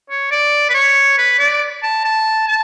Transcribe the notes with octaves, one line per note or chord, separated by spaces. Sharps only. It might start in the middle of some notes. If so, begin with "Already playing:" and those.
C#5
D5
B4
C#5
B4
D5
A5
A5
A5